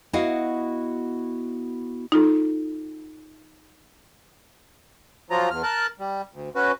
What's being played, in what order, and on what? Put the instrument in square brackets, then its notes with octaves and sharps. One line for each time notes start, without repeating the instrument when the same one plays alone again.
[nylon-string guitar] B3 E4 F#4 D#5 F5 F#5
[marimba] D#4 F4 A4
[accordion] F3 F#3 F4 A#5
E2 F6
A#4 A5 F#6
G3
D2
C#4 F#4 B4